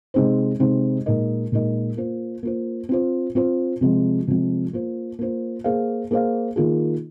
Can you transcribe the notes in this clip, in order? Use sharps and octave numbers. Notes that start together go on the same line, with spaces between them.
C3 G#3 C4 D#4 C5
C3 G#3 C4 D#4 C5
A#2 G#3 D#4 A#4 D#5
A#2 G#3 D#4 A#4 D#5
A#3 F4 C5
A#3 F4 C5
C4 F4 C5
C4 F4 C5
C3 F3 G#3 C4
C3 F3 G#3 C4
A#3 F4 C5
A#3 F4 C5
A#3 G#4 C5 F5
A#3 G#4 C5 F5
D#3 A#3 F4 G#4